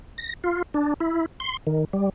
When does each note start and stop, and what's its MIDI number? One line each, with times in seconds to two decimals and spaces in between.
0.18 0.33 94
0.44 0.62 65
0.74 0.94 62
1.00 1.26 64
1.40 1.57 84
1.67 1.85 51
1.93 2.10 55